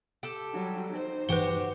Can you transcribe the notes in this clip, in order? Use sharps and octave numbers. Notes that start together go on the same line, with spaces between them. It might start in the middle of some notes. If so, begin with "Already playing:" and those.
G4 A4
F#3 G3
D#4 C5
G2 E3 F3 F#4 G4 B4 G7